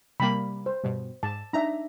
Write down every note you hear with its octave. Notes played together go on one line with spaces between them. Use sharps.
C3 G3 A#3 B5
C5
G2 B2
G#2 A5
D4 D#4 E5 A#5